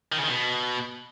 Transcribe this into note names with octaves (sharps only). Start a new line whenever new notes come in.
D#3
C#3
D#3
B2